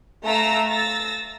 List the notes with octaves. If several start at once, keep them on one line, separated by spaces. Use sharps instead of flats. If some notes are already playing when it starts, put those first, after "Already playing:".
A3 F5 A#5 E6 A#6
E6 A6 A#6